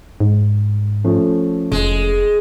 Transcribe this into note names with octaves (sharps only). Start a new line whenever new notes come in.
G#2
F3 A3 C#4
F1 G#3